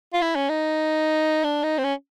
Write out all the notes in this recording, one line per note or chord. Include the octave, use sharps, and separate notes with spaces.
F4
E4
C#4
D#4
D4
D#4
C4
C#4